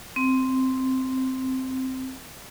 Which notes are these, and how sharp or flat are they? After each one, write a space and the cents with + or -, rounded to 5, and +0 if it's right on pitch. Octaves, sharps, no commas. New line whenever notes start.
C4 -5